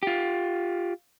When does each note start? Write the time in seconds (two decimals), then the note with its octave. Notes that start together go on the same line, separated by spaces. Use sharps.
0.03 F4 G4